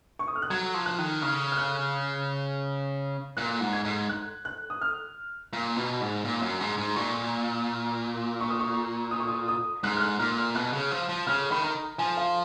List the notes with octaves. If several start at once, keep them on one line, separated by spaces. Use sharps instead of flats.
C#6
D#6
F6
F#6
F#3 G#6
F3
F#6
D#3
C#3 F6
F6
F#6
A#2 F#6
G#2
G#6
G#2
F#6
F#6
D#6
F6
A#2
B2
G#2
A#2
F#2
G#2
G#2
A#2 C#6
C#6
D#6
C#6
D#6
C#6
D#6
D#6
G#2 F#6
F6
F#6
A#2 F6
F6
B2 F#6
C#3
F3
F3
C#3 F6
D#3 B5
A#5
F3 G#5
F5